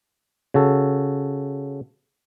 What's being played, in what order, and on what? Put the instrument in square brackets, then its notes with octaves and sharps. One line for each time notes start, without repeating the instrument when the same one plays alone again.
[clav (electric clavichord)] C#3 F#4 A4